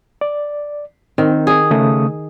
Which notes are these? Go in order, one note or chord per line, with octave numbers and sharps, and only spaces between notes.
D5
D#3 C4
G#4
C#3 A3 D#6